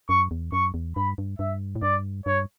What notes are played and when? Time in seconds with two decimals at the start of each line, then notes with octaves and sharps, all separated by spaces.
0.09 F#2 C#6
0.31 E2
0.52 F#2 C#6
0.74 E2
0.96 G2 B5
1.18 G2
1.39 G2 E5
1.76 A2
1.82 G2 D5
2.26 G2 C#5